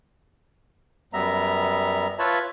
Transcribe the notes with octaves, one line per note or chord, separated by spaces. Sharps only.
F#2 G3 B3 E5 A#5
F4 B4 C#5 E5 A5 B5